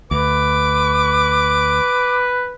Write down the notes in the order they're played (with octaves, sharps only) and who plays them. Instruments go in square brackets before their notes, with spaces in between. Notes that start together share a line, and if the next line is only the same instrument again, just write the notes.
[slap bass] D2 [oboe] B4 [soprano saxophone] D6